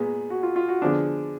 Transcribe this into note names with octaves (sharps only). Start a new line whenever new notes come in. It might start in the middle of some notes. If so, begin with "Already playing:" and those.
Already playing: A#2 G#3 B3 G#4
F#4
F4
F4
F#4
D3 F3 B3 D4 G#4